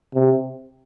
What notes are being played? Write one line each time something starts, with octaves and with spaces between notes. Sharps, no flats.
C3